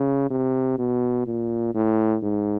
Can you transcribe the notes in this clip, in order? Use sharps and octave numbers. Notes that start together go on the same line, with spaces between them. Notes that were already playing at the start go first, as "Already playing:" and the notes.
Already playing: C#3
C3
B2
A#2
A2
G#2